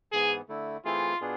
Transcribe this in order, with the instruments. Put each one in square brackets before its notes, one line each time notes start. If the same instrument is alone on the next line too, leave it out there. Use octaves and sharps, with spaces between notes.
[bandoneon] G#2 E3 B3 [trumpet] G#4
[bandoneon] D3 A3 E4
[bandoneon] E3 A3 C4 E4 G#4 [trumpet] F4
[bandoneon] B2 B3 D4 F4 G#4